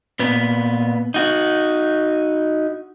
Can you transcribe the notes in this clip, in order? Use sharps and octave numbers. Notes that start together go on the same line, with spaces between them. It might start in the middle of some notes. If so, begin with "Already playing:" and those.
A#2 B3
D#4 F#4